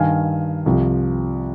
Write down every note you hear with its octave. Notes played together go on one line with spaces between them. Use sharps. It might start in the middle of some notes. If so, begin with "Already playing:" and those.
Already playing: G2 D#3 F5 G#5
C2 C3 F3